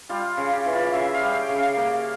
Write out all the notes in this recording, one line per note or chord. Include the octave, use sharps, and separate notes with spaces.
G3 F4
C#3
G4
E3
F4
C#3 E5
F5
G3
G5
C#3
F5
A#3 G5